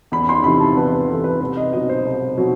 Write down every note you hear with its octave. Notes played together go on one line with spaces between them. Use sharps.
E2 B5
C6
C3 E3 B5
A5
E2 B4
B4
C3 E3 A4
B4
C2 B4
D#5
B2 F#3 D#5
C5
C2
B2 F#3